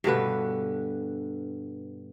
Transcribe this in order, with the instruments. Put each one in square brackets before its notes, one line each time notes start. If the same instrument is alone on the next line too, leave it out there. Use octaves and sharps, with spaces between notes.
[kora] G2 B2 D3 B4